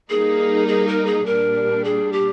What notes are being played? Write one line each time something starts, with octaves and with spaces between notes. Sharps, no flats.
G3 A#3 D#4 G#4
G#4
A#4
G#4
A#2 G3 D4 A#4
G#4
G4